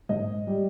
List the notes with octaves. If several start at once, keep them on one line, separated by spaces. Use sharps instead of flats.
G#2 D#5
G3